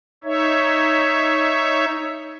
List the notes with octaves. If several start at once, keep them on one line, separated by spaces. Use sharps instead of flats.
D#4 C#5 E5